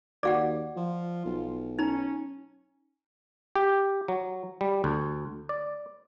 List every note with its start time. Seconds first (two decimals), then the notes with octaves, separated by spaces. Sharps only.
0.23 D#2 F#4 D5 F5 F#5 D6
0.77 F3 F4
1.26 B1
1.79 C#4 D#4 A#5
3.56 G4
4.08 F#3
4.61 G3
4.84 D2
5.49 D5